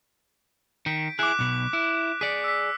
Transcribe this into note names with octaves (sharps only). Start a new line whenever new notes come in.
D#3 G6 B6 D7
E4 G#4 D6 F#6
B1 B2
E4
G#4 D5 B6 C#7
E6 B6